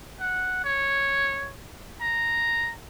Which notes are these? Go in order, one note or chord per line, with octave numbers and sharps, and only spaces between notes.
F#5
C#5
A#5